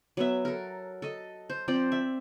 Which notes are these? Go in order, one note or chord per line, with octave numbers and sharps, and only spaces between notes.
F#3 B3 E5
A4 A#4
A4 D#5
C5
F3 C4 C5 D5
E5